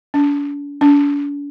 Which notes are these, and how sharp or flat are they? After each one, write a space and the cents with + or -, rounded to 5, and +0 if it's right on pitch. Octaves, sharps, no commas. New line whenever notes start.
D4 -45
D4 -45